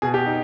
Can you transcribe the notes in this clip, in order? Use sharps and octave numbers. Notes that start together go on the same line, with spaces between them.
B2 G#4
G4
D#4